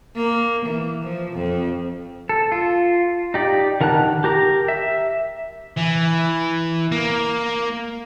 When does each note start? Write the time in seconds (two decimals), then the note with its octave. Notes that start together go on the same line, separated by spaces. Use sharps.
0.16 A#3
0.65 E3
1.04 F3
1.33 F2
2.29 A4
2.52 F4
3.34 D#4 G4 D5
3.81 D#3 A#4 F#5 A5 F#6
4.24 G4 A#4 A#5
4.68 E5
5.77 E3
6.92 A#3